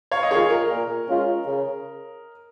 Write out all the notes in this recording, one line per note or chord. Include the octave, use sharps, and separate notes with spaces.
C#5 F5
D#5
D#3 A#3 F4 G#4 C#5
A#4 D#5
A#2
G#3 C#4 F4
C#3